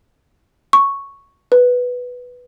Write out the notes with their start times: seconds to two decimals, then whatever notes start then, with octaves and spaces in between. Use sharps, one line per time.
0.73 C#6
1.52 B4